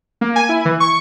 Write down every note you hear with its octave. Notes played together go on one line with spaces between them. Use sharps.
A#3
G#5
E4
E3
C#6